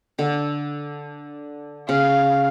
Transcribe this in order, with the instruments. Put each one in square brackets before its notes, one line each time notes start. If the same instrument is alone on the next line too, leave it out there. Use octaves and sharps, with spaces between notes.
[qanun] D3
[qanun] C#3 [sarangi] F5